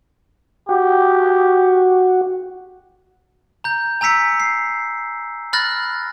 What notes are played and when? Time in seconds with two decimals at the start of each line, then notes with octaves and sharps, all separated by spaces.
0.69 F#4 G4
3.64 A#5 G6
4.01 G#5 A#5 E6 B6 C#7
4.40 C7
5.53 B5 F6 F#6 A6 A#6